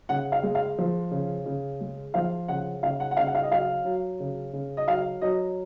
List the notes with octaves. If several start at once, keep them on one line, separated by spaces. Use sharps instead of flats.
C#3 F#5
F5
G#3
F5
F3
C#3
C#3
G#3
F3 F5
C#3 F#5
C#3 F5
F#5
F#5
C#3 F5
F#5
F5
D#5
F#3 F5
F#3
C#3
C#3
D#5
F#3 F5
F#3 D#5